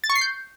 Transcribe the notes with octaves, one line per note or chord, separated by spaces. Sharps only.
A6
C#6
C7
G6